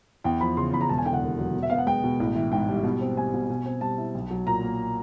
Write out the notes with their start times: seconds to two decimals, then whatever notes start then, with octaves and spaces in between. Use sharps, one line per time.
0.24 E2 G5
0.41 F3 B5
0.57 C#3 C6
0.73 E2 B5
0.81 A#5
0.89 E1 A5
0.98 G#5
1.05 D3 G5
1.13 F#5
1.22 D#2
1.39 F#3
1.54 B2
1.62 E5
1.70 B3 F5
1.78 F#5
1.86 G#3 G5
2.04 B2
2.20 A1
2.36 E3
2.52 G#2 G5
2.68 G3
2.84 B2
3.01 C4
3.17 G3 G#5
3.33 B2
3.50 B2
3.66 C4
3.81 G3 A5
3.98 E4
4.15 B1
4.31 F#3
4.47 A#2 A#5
4.63 A#3